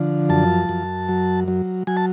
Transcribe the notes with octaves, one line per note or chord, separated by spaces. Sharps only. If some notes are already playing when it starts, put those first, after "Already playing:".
Already playing: D3 F3
F#2 A5
F#2
F#3
F#3
F#3 G#5
A5